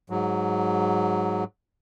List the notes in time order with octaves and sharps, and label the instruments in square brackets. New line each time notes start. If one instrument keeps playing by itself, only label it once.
[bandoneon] G#2 F#3